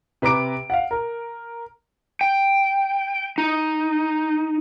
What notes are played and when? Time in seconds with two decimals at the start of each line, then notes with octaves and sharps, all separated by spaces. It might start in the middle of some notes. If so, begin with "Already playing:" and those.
0.22 C3 B4 A#5 D6 D7
0.70 F5 F#5
0.91 A#4
2.21 G5
3.38 D#4